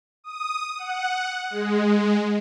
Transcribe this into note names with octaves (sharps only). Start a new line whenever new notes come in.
D#6
F#5
G#3